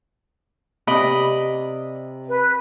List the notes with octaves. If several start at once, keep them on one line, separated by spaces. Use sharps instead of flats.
C3 D5 D#5 B5
B4